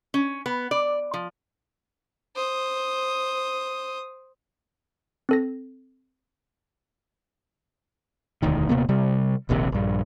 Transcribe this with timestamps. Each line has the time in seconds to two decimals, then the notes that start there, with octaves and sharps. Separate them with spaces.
0.14 C#4
0.46 B3
0.71 D5
1.14 F3
2.35 C5 D#6
5.29 C4 A4 A#6
8.42 E1 D2 D#3
8.69 D#1 C3 A#3 B3
8.89 C3 G3
9.49 D#1 A#1 D#2 C3
9.72 A#1 G2